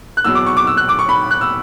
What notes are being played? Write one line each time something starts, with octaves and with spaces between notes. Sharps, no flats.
F#6
E2 B2 F#3 E6
D6
C#6
D6
E6
F#6
D6
C#6
B5
F#6
E6